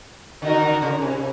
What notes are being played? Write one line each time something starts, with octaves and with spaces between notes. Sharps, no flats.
D3 D#4 F#4 A#4
D3
C#3
C3